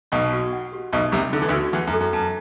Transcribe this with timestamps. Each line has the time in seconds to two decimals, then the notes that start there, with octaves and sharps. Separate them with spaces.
0.12 B1 B2 F#5
0.32 F#4
0.53 F#5
0.72 G4
0.93 B1 B2 E5
1.12 C2 C3 E5
1.33 D3 A4
1.42 E3
1.49 D2 D3
1.53 F#4
1.73 E2 E3 F#5
1.87 F#2
1.93 A4
2.00 F#2
2.13 F#2 A5